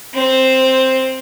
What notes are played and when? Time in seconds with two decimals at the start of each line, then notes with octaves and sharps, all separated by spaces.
0.14 C4 C5